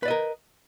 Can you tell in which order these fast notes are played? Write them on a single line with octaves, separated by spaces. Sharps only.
B4 D5 D#5 A#4